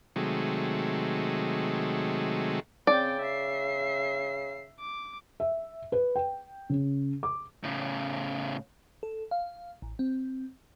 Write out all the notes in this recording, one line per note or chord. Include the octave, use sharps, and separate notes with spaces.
C3 D#3 F#3 G#3 A3
C#3 C4 D5 G5
E5 C7
D6
E5
B4
G5
C#3
D6
A2 C#3
A4
F5
A1
C4